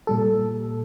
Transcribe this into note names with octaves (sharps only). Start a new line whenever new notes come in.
A#2 G3 A4